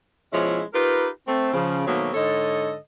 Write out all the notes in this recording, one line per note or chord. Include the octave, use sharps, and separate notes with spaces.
B2 F3 G#3 C#4 E4
D#4 F4 G4 A#4 B4
A3 C4
C#3 F3
B2 D#3 F#3 A3 A#3 C4
G#2 D3 A4 C#5 D#5